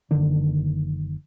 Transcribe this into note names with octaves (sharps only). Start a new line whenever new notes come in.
F#1 D3 D#3 D4